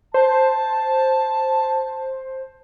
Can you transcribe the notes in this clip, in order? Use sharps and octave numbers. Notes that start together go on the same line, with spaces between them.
C5 A5